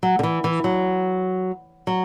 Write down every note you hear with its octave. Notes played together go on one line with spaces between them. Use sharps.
F#3
D3
E3
E3
F#3
F#3